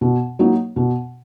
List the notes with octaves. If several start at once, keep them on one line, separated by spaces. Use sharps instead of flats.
B2
F#3 A#3 D#4
B2